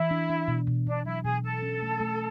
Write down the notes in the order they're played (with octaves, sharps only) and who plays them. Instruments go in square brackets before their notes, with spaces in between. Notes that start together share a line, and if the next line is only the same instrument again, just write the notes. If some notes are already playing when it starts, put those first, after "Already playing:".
Already playing: [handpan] E3 [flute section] E4
[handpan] D4
D4
B2
B2
[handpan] B2 [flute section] D4
[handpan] F#3 [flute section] E4
[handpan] B2 [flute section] G#4
[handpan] B2 [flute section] A4
[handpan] C#4
A3
A3